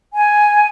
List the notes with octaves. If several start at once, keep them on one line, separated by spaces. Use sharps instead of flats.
G#5